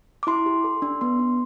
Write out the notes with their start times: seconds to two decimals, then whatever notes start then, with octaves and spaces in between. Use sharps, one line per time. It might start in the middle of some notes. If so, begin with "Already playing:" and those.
0.23 D6
0.27 E4 C6
0.46 G4
0.64 A4
0.82 D4
1.01 B3 C6
1.19 D4